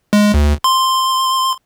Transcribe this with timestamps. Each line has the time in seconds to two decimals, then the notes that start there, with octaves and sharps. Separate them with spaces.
0.13 G#3
0.34 D2
0.64 C6